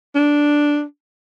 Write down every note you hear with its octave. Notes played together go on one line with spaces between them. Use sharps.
D4